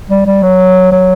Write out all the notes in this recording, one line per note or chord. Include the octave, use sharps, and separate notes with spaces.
G3
G3
F#3
F#3